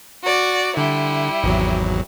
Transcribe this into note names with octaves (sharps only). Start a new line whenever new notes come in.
F#4 D5
D3 G3 E4
G#1 E2 F#3